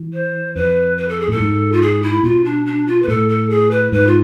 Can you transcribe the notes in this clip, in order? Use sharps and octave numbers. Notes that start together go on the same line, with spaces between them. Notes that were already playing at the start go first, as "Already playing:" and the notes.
Already playing: E3
C5
F2 B4
B4
A4
G#4
A2 A4
G#2
F4
G#4
E4
B2 F4
D4
D4
F4
B4
A2 A4
A4
G#4
B4
G#2 B4
F4